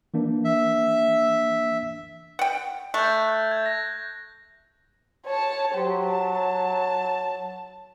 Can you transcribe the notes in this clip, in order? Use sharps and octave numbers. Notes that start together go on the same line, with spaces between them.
E3 A#3 D4
E5
F#5 G5
A3 F#6 G6
G6 G#6
A#6
C#5 A5
F#3 G4 C5
A5